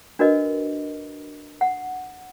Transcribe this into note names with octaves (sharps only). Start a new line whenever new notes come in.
D4 F#4 A#4 B4 D#5
F#5